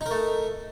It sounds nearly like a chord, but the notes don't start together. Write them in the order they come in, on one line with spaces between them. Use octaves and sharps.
D#4 A#4 A3